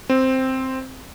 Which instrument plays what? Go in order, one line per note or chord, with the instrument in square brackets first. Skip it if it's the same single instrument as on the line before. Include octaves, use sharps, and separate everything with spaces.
[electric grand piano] C4